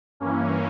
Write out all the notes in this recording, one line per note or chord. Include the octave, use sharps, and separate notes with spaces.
G2 E3 A#3 C#4